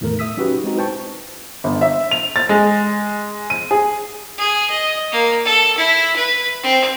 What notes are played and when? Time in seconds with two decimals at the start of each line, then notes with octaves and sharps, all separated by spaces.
0.01 E2 A2 D#3 A3 A#4
0.19 E5 D#6 E6 B6
0.37 F#3 C#4 D#4 F#4 G4 B4
0.64 G#3 C4 D#4 F#4
0.77 E4 B4 C5 G5 A5 C#6
1.64 G1
1.81 E5
2.11 F7
2.36 A6
2.49 G#3
3.50 D#7
3.71 G#4
4.38 G#4
4.70 D#5
5.12 A#3
5.45 A4
5.78 E4
6.16 B4
6.63 C4